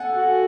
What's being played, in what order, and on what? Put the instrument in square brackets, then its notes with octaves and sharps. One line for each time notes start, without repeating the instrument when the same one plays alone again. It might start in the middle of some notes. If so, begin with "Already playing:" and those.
Already playing: [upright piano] A4 F#5 G#5
[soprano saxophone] F#4